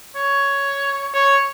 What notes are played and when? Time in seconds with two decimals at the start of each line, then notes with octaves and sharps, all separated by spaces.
0.15 C#5
1.14 C#5